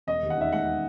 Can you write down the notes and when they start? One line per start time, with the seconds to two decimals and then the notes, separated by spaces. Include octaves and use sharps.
0.07 E1 D#5
0.22 D#2
0.30 F#5
0.37 D#3 E5
0.53 G#3 F#5